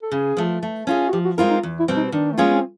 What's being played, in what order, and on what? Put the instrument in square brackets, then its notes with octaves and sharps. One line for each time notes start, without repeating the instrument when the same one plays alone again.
[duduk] A4
[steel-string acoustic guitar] C#3 [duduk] G#4
[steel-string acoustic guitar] F3 A3
A3
C#4 F4 G#4
[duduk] F#4
[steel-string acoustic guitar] F3 [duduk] G4
[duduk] F#4
[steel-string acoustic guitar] G#3 C4 F4 A#4 [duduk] E4
[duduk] D#4
[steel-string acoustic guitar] E2
[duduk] E4
[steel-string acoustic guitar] B2 G3 C4
[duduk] D#4
[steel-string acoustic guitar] D#3 [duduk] D4
[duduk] A3
[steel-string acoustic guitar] G#3 C#4 F4 G#4 [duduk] A#3
[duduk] B3
C4